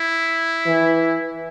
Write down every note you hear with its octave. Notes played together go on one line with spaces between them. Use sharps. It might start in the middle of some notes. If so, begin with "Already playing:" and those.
Already playing: E4
E3